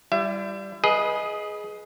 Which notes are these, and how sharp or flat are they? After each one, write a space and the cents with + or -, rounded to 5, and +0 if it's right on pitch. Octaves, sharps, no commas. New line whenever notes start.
G3 +0 E4 +40 E5 +35
G#4 +15 B4 -20 D#5 +0